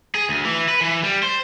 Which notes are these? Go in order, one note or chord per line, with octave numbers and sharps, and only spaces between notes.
G#4
D2
E3
B4
E3
G3
C5